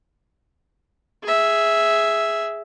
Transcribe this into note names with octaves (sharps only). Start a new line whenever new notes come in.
G#4 E5